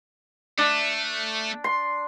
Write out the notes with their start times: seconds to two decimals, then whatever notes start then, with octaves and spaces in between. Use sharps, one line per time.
0.58 A3 D4
1.64 C6